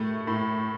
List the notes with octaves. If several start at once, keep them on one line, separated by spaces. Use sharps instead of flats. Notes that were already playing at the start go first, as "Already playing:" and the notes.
Already playing: A2 A3
A2